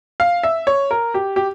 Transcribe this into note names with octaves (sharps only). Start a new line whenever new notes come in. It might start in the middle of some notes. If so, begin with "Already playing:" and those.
F5
E5
C#5
A#4
G4
G4